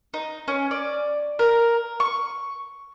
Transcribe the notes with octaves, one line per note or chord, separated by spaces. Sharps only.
D#4
C#4
D5
A#4
C#6